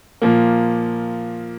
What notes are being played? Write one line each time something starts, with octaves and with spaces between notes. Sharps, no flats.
A#2 F3 A#3